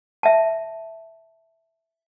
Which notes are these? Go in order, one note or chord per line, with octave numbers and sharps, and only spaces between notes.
E5 A5